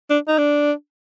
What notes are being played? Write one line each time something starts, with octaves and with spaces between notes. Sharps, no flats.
D4
D#4
D4